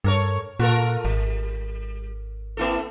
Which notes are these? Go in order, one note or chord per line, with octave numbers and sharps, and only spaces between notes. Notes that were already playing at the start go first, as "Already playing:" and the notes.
G2 A4 A#4 C#5
A#2 F4 A4 A#4
G#1 G3
A#3 E4 A4